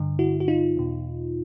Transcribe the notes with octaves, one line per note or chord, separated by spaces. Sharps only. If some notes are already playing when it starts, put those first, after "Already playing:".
Already playing: G2 D3
E4 F#4
F#4
D#4 F4
E2 B2